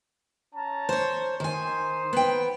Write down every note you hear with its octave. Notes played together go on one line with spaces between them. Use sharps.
C#4 A5 A#5
C5 C#5
D#3 D#4 C5 G#5
B3 G5